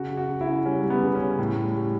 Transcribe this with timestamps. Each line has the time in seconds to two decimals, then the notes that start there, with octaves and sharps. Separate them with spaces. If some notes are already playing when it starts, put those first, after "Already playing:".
Already playing: C#3 F#4
0.11 C#3
0.17 F#4
0.29 C#3
0.41 E4
0.48 C#3
0.65 G3 C#4
0.84 G3
0.90 B3
1.02 C#3
1.15 C#4
1.20 C#3
1.39 A2
1.57 G3
1.75 G3